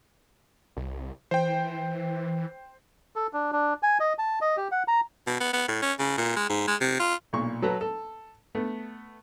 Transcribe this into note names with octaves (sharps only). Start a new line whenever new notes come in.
C2
E3 C5 G5
A4
D4
D4
G#5
D#5
A5
D#5
G4
F#5
A#5
B2
B3
B3
A2
C#4
C#3
A#2
G#3
G#2
G#3
C3
F4
B1 A#2 C#6
F#3 A4 B4 A#5
A4
A3 B3